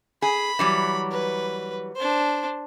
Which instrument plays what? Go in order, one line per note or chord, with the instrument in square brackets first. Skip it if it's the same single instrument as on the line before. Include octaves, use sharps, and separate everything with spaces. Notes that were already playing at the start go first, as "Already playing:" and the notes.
[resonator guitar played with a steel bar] G#4 [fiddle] B5
[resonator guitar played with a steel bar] E3 F#3 G3
[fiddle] B4
D4 C5